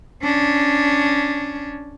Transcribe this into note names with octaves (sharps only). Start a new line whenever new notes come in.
C#4 D4